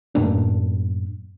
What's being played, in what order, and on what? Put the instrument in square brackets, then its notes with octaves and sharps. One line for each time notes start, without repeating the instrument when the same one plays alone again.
[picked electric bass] F#2 A2 A#3 D4